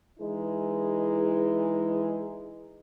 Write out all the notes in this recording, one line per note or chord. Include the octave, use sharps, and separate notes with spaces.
E3 G#3 D#4 E4 G#4